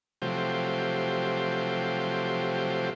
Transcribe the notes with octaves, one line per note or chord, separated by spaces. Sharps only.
C3 F3 F#3 A3 G4 C5